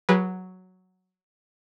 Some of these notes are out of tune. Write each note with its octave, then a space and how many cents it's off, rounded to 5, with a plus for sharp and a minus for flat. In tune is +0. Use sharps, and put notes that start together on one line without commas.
F#3 +0 G#4 -30 B4 -25